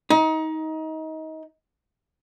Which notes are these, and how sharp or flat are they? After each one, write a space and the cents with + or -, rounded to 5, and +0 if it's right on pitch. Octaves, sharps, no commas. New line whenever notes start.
D#4 +25